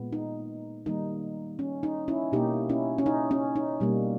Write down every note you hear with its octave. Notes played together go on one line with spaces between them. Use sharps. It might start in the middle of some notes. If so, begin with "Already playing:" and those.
Already playing: A#2 G#3 B3
D#4
D#3 G3 A#3 D#4
C#4
D#4
C#4 E4
B2 A#3 D#4 G4
C#4 E4
C#4
D#4
C#4
D#4
B2 G3 A#3